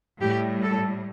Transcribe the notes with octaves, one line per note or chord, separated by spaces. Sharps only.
A2 G3 G4
A4